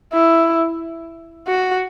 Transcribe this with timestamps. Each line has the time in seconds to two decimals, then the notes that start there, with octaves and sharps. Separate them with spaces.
0.13 E4
1.47 F#4